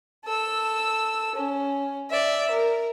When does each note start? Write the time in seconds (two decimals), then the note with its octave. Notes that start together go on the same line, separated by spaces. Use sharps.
0.25 A4 E6
1.35 C#4
2.10 D5 E5
2.50 A#4